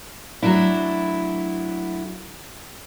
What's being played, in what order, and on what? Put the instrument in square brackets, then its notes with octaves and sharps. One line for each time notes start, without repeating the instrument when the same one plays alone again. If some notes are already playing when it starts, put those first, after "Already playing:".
[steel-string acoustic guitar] F#3 A3 D4 E4